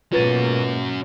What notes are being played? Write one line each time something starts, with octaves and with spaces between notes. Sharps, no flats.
G#2 B2 A#3 C#4 F4 F#4 B4 A6